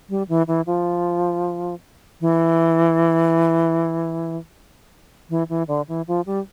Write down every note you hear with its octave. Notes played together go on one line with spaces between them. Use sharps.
G3
E3
E3
F3
E3
E3
E3
D3
E3
F3
G3